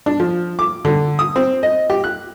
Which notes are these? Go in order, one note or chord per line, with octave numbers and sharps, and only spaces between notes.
D4
F3
D6
D3
D#6
C4
D#5
G4
F#6